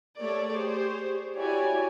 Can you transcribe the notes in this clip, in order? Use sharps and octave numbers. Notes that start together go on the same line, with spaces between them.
A3 G4 A4 A#4 C#5 D5
G4 G#4 C5 C#5
E4 F#4 G4 C#5 D5 G#5